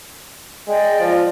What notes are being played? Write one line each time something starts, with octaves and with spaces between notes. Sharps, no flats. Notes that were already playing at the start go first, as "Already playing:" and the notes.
G#3 D5 D#5 G5
F3